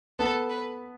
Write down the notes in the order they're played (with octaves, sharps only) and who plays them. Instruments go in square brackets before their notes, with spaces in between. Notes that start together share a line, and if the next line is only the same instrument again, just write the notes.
[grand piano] B3 [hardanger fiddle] A4
[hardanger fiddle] B4